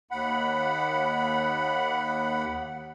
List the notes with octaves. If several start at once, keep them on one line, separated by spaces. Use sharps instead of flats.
D#2 F#5 B5